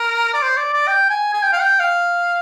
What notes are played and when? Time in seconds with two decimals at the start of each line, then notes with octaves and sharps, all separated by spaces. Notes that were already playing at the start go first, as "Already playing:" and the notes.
Already playing: A#4
0.34 D5
0.42 C5
0.57 D5
0.73 D5
0.88 G5
1.10 G#5
1.33 G#5
1.42 G5
1.52 F5
1.61 G5
1.80 F5